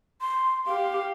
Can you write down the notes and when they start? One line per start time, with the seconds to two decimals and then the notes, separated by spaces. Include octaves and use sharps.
0.21 C6
0.67 G4 F5